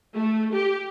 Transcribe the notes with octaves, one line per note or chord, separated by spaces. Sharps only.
A3
G4